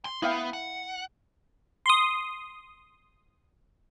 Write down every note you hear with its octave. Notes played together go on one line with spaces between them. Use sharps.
C6
B3 E4 F5 G5
F#5
C6 D#6